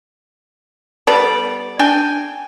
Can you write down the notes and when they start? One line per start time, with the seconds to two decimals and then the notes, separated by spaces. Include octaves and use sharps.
1.07 G3 B3 A4 D5
1.79 D4 G5 G#5